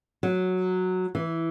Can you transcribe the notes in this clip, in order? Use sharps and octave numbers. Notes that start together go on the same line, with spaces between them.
F#3
E3